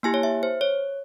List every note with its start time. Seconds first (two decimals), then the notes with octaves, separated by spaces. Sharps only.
0.03 A#3 E4 G4 G#5
0.14 C#5
0.23 E5
0.43 C5
0.61 C#5